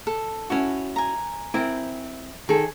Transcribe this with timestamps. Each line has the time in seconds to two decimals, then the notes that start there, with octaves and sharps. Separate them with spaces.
0.07 A4
0.50 C#4 E4 F#4
0.96 G#5 A#5
1.54 C4 E4 A#4
2.49 D#3 G#4 A4